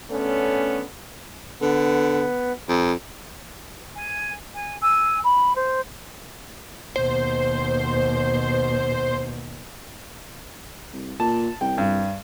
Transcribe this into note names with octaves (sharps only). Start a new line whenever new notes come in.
D3 A3 B3 C#4
D3 B3
F2
G#5
G#5
G#5 E6
B5
C5
D#2 B2 C5
C2
A#2 A5
C2 G5
G2